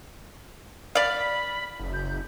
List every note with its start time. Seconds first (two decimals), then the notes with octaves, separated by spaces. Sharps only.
0.95 D5 F5 B5
1.79 F#1
1.93 G6